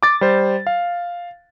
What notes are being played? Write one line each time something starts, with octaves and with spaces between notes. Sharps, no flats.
D6 A6
G3 C5
F5